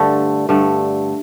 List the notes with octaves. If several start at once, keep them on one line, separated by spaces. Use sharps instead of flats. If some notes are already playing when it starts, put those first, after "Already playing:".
Already playing: G2 D3 A3
G2 D3 A3